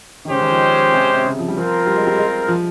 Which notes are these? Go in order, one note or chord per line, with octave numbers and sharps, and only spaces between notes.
D#3
C#3 G#3 C#4 G4 C5
D#3
F3
C3
C3
C#3
F3
G3
F3 C4 F4 A#4
G3
G#3
G3
G#3
F3